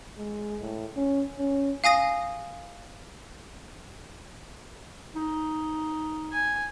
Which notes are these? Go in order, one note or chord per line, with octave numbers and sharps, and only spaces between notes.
G#3
A2
C#4
C#4
F5 G#5 D#6 A#6
D#4
G#5